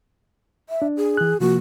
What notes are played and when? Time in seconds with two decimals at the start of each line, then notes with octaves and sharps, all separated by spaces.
0.69 E5
0.82 D4
0.97 G#4
1.17 E3 F#6
1.40 C3 F3 A#3 F#4